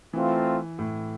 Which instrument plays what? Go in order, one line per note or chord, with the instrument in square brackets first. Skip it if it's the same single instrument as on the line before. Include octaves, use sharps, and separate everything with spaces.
[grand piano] E3 [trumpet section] A3 C4 F4
[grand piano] A2